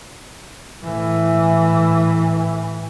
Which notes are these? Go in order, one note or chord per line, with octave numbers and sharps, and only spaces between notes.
A2 E3